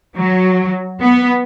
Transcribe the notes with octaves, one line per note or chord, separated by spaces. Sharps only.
F#3
B3